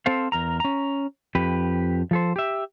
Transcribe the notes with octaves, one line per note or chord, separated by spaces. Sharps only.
C4 A4 C5 F5
E2 A#4 A#5
C#4 A#5
F2 G4 B4
F3 A4 C5
G4 E5